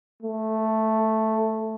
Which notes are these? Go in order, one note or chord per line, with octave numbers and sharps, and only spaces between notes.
A3